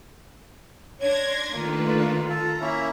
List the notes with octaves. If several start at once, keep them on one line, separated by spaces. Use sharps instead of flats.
D4 C#5 C6 G#6 A#6
D#3 A3 A#3 D4 F4 B4
A4 A#5
A#3 C#4 E4 E5